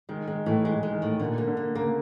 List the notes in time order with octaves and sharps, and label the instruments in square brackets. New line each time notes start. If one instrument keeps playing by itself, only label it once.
[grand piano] D#3 [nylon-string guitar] G#3
[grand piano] D#3 [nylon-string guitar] G#3
[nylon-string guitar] A2 [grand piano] E3
[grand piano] E3 [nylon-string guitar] G#3
[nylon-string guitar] G#3
[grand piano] D#3
[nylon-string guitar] A2
[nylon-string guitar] A#2 [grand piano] D3
[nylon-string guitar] A#3
[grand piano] D3
[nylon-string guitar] A#3
[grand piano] C#3 [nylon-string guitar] A#3